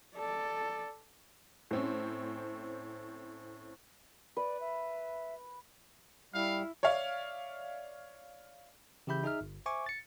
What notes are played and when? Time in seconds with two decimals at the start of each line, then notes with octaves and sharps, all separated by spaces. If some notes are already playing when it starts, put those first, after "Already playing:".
0.16 A4 D5
1.71 A2 C4 C#4
4.37 B4 D5
4.60 E5
6.34 G3 E4 F5
6.83 C#5 D5 E5 F5
9.07 C#3 E3 G4 E5 B5 G6
9.24 D#4 G#4 E5 F6
9.41 G1
9.66 C5 E5 G#5 C#6 D6
9.86 A6 C#7